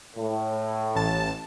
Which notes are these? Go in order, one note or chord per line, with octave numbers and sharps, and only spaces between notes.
A2
A1 A5